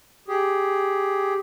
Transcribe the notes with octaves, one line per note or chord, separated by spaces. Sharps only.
G4 G#4